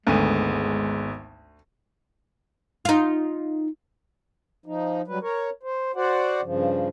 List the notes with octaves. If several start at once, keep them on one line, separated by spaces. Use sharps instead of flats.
G#1 D2 G#3 B3 D#7
D#4 F4
F3 D#4
F#3 G3 B4
A#4 C#5
C5
F#4 C5 D5 F#5
G2 C#3 F3